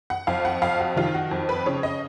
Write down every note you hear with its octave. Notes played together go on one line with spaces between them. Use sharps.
F#5
F2 F5
F#5
F2 F5
F#4
D#3 F4
F#4
F2
B4
C#3 C#5
D#5